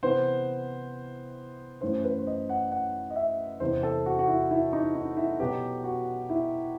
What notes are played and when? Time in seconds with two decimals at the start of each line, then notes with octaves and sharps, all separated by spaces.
0.03 C3 E3 B3 C5
1.81 F#2 E3 A3 C5
2.04 B4
2.19 C5
2.27 D#5
2.49 F#5
2.72 F#5
3.10 D#5
3.16 E5
3.60 E2 C3 E3 C5
3.83 A4
4.06 F#4
4.19 F#4
4.28 E4
4.51 E4
4.73 D#4
4.95 D#4
5.17 E4
5.40 B2 F#3 B3 G4
5.84 F#4
6.30 E4